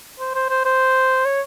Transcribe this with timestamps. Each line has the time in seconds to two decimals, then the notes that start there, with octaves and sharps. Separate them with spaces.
0.19 C5
0.35 C5
0.50 C5
0.65 C5
1.25 C#5